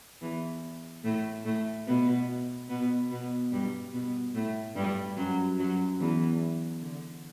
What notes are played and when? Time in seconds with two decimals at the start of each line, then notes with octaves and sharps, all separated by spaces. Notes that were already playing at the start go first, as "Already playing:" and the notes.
0.22 E2 E3
1.04 A2 A3
1.46 A2 A3
1.87 B2 B3
2.69 B2 B3
3.11 B2 B3
3.52 G2 G3
3.93 B2 B3
4.35 A2 A3
4.76 G2 G3
5.17 F#2 F#3
5.58 F#2 F#3
6.00 E2 E3
6.82 D3